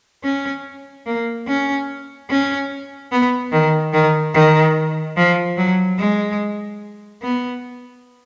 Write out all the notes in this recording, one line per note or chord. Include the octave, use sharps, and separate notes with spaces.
C#4
A#3
C#4
C#4
B3
D#3
D#3
D#3
F3
F#3
G#3
B3